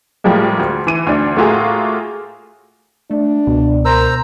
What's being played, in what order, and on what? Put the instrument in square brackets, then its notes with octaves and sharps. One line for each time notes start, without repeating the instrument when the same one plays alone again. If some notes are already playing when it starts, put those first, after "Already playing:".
[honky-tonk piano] A2 F3 G3 G#3 A#3
D2
E3 D#7
D2 D4
A2 A3 A#3 F4 F#4 G#4
[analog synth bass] A3 [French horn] D4
[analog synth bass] C#2 [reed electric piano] B2
[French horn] A#4 [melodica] C5 A#5 E6